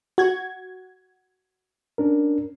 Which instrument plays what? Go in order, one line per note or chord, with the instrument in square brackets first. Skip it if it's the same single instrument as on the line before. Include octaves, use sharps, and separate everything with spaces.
[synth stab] F#4 G#6
[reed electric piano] C#4 D4 A#4